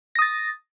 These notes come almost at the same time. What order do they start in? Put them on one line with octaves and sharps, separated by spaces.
A#6 D#6 A6